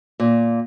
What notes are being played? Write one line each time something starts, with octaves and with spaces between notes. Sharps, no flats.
A#2